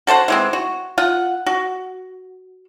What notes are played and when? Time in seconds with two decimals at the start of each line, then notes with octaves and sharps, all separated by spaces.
0.07 F#4 A4 C5 F#5
0.28 E3 G#3 C4
0.53 F#4
0.98 F4 F#5
1.46 F#4